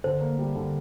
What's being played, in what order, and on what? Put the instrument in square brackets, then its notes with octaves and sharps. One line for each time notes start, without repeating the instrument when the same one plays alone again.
[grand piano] D3 [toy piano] C5
[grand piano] A#3
G3
D3